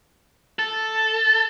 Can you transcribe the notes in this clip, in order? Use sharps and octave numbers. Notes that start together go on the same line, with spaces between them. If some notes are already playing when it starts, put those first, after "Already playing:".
A4